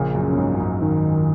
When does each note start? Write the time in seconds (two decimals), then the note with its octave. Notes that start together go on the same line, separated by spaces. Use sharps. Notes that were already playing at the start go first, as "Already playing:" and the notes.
Already playing: A#1 A#2 C#3
0.15 F#2
0.33 A#2
0.38 G#2
0.55 F#2
0.60 G#2
0.82 D#3